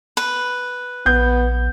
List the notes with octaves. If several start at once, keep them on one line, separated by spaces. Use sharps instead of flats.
B4
A#1 B3 G6